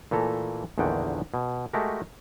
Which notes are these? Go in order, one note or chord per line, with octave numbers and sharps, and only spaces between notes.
A#2 E3 A3 A4 A#5
A#1 E2 D3 D#3 F#5 G5
B2
G#3 A3 F#4 G4 A#4